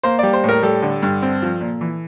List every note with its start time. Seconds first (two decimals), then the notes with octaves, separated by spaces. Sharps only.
0.03 A#3 C5
0.19 G3 D5
0.33 C5
0.44 A2 A#4
0.63 G3 A4
0.82 D3
1.03 G2
1.22 C4
1.42 F3
1.61 A#2
1.81 E3